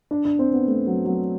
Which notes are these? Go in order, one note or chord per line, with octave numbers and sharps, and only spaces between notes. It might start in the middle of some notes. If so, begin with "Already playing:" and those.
D4
D4
C4
B3
A3
F#3
F#3